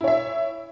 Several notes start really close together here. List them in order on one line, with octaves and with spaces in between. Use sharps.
E4 C#5 E5